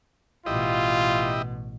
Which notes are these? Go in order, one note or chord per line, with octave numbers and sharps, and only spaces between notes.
A1 B2 E4 F4 G4 D#5